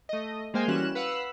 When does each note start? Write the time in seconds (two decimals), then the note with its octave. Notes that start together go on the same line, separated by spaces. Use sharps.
0.09 A3 D#5
0.54 G#3 A#3 C5 F5 G5 G#5
0.68 E3 G3 C#4 F#4 F#6 E7
0.95 B4 F5 F#5 E6 F#6